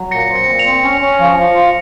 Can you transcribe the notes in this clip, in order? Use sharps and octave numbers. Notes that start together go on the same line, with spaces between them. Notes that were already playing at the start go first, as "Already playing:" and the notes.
Already playing: F#3
A#2 A#6 C#7
C4
A#6 C#7
A#2
C#7 F7
C4
C#4
C#4
F3
F3
F4